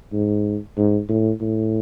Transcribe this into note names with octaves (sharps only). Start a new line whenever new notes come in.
G#2
G#2
A2
A2